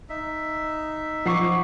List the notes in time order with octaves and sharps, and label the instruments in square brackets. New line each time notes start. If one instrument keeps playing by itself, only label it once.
[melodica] D#4 E5
[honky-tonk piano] F3 C7 [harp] F#5 C#6 D6